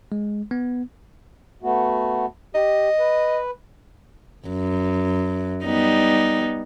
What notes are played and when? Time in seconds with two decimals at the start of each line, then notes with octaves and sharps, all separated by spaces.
0.12 G#3
0.51 B3
1.63 A3 B3 F#4
2.55 G4 D#5
2.99 B4
4.48 F#2
5.64 G3 B3 D#4